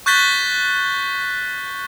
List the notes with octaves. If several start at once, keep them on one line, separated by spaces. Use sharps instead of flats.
C#6 F#6 G6 A6 B6 G7